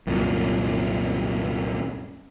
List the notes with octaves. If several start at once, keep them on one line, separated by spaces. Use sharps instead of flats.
C2 F#2 A#2